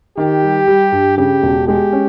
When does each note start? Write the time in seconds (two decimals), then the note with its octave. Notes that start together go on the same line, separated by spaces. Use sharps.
0.17 D#3 G4
0.43 G3
0.67 G3
0.92 G2
1.18 C#3 G4
1.43 E1
1.67 G#3 G4
1.92 C#4